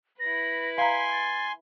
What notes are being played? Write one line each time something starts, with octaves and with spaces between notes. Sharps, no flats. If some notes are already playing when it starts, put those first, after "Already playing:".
E4 B4 A#6
F5 G#5 A#5 C6 B6
A6